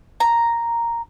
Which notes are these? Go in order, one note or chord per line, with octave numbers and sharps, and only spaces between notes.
A#5